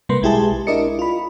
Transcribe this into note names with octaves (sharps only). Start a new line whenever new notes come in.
C3 G3 A#3 B4 C6
B1 G#3 E4 G4 G#4 A5
D4 E4 A#4 D5 D#5 C#7
F4 B5